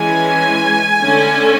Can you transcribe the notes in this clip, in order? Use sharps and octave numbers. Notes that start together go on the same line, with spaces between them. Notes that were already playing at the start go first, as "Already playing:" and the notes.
Already playing: E3 G#3 C#4 G#5
D3 A3 C#4